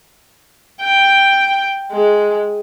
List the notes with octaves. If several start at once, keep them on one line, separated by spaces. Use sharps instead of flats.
G5
G#3